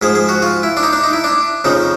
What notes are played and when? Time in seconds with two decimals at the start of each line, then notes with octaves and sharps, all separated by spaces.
0.02 G#2 F3 G#4
0.15 G#4
0.29 F#4
0.42 F4
0.63 E4
0.77 D4
0.83 D#4
0.93 D4
1.04 D#4
1.13 E4
1.24 D4
1.64 F2 C#3 F3 D#4